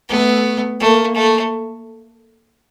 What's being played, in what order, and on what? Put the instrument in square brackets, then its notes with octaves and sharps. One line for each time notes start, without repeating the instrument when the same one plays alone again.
[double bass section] A3 [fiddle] B3
[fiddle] A3 [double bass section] A#3
[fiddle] A3